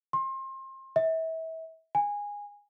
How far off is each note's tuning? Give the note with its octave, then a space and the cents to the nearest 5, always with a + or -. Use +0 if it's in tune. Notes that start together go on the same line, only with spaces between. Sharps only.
C6 +30
E5 -30
G#5 -15